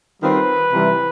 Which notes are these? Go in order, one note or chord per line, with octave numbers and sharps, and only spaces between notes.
D#3 G3 C4 F4 B4
C3 E3 G3